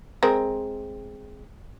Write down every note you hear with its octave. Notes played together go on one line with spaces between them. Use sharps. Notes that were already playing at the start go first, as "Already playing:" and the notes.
G#3 C4 A#4